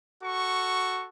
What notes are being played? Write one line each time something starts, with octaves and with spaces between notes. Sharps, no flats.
F#4 A4 C#6